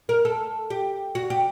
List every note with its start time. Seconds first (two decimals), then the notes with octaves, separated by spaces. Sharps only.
0.09 A#4
0.25 A4
0.70 G4
1.15 F#4
1.30 G4